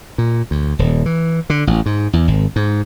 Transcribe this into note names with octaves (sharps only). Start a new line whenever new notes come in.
A#2
D2
D#1
E3
D3
A1
G#2
E2
G#1
G#2